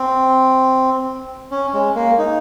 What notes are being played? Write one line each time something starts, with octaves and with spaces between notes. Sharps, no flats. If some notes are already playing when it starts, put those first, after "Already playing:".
Already playing: C4
C#4
G#3
A#3
D#4